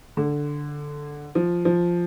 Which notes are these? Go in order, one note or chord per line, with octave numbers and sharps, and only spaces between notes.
D3
F3
F3